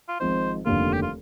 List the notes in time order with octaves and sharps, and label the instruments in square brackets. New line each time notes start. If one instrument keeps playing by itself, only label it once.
[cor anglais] F4
[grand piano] G#1 G#2 F3 C4 D#4 [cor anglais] C5
[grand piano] F1 D#2 D3 G3 A#3 [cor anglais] F4
[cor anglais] G4
F4